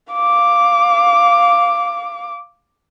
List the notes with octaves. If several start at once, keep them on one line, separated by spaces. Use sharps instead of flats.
F5 D6